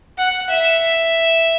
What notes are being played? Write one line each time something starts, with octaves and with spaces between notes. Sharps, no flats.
F#5
E5